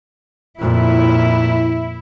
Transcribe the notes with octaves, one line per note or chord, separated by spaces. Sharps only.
F2 A#2 E4